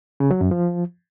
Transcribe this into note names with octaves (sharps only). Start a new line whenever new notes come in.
C#3
F#3
F#2
F3